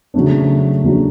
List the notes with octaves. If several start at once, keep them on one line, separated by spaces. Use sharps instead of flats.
C#3 F#3 A3 D4
C#3 F#3 A3 D4